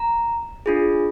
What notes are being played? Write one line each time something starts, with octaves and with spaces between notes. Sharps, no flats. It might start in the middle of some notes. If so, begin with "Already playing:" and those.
Already playing: A#5
D4 F4 G#4